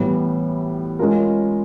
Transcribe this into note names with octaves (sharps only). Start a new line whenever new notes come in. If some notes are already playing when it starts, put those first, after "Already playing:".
Already playing: A2 E3 G3 B3
G#3 C#4 F4 A#4